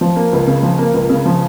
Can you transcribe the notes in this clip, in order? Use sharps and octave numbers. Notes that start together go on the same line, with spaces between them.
F3
A#3
C#2
C#3
F3
A#3
C#2
C#3
F3